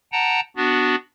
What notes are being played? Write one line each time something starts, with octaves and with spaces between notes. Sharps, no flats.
F#5 G5 A5 A#5
B3 D4 F#4